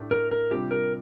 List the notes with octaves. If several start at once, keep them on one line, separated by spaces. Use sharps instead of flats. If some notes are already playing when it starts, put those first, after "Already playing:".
Already playing: A2 A3 D4 G4
A#4
A#4
C3 G3 D4 F4 G4
A#4